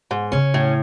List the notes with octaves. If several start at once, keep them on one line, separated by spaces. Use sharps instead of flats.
G#2
C#3 C#4
A2